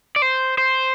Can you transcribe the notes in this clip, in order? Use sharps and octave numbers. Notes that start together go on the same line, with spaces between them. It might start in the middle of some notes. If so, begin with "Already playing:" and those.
D5
C5
C5